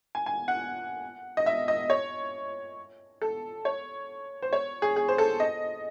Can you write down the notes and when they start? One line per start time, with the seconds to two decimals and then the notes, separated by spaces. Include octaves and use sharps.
0.15 G#5
0.26 G#5
0.48 F#5
1.37 D#5
1.46 E5
1.68 D#5
1.90 C#5
3.22 A4
3.65 C#5
4.42 C5
4.53 C#5
4.82 G#4
4.96 G#4
5.08 C5
5.18 A4
5.40 D#5